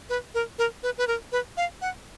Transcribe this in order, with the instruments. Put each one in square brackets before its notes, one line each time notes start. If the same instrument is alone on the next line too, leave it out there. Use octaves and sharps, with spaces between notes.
[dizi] B4
A#4
A#4
B4
B4
A#4
B4
F5
F#5